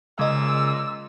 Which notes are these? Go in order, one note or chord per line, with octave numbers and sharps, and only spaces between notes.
A#2 C#3 G#3 D#5 E6